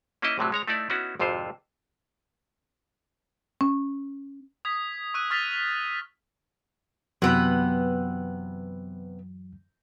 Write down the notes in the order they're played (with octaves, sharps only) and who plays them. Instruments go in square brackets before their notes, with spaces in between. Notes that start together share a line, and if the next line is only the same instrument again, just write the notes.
[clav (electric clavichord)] A#3 C#4 D#4 E4 D#5
A#1 A2 C3 F#3
G#3 C#5 A#5
A3 D#4 E4 D5
B3 C#4 D#4 E4 F#4
G#1 F2 C3 F4 C5
[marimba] C#4
[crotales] D#6 G#6 B6
C#6 E6 F#6 D#7
C#6 F6 A6 B6 F7
[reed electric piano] F#2 E3 F#3 [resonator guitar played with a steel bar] C3 B3 B4